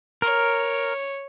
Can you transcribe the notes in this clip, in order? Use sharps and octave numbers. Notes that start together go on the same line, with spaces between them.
A#4 C#5